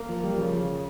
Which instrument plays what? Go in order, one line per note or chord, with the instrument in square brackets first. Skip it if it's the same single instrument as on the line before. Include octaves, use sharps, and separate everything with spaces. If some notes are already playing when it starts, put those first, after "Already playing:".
Already playing: [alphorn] A#3
[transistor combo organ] F3
G3
[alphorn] C#3 [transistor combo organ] F3